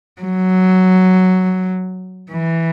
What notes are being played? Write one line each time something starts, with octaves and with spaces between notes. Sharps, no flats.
F#3
E3